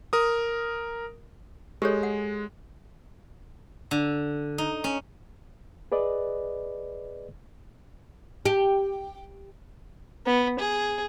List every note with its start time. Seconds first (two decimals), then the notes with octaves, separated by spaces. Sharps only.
0.13 A#4 D#6
1.82 G#3 G4 A4 C#5
2.03 F#5
3.91 D3
4.58 D#4
4.84 C#4
5.92 G#4 B4 D5 D#5
8.46 G4
10.26 B3
10.59 G#4